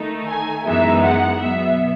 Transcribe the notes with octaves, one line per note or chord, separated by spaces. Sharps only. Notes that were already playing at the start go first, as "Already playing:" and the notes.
Already playing: D#3 A3 D#4
G#5
F#2 E3 G#3 B3 D#4 E5
F#5
B2 F#3 B3 E5